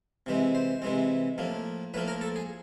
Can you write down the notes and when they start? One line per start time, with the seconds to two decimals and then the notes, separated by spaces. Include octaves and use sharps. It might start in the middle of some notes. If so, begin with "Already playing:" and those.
0.26 C3 E3 G#3 C4
0.55 C5
0.82 C3 E3 G#3 C4
1.38 A2 F3 A#3
1.94 A2 F3 A#3 B4
2.08 A#4
2.21 A4
2.36 G#4